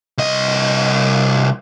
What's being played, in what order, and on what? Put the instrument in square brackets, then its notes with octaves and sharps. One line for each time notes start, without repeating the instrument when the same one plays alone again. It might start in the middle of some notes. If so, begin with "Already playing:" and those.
[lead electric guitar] C2 D#5